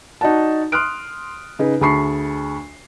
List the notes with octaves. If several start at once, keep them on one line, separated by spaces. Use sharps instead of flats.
D#4 F#4 D5 F#5 A5
C6 D#6 F6 F#6 D7
C#3 D#4 G#4 B4
D2 G#4 A5 B5 C#6 C7